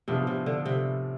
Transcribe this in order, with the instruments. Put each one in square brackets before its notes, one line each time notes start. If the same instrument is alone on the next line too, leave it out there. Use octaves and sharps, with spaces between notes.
[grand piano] A2 F3 B3 D4 G#4 [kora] C3
[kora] C3
D3
C3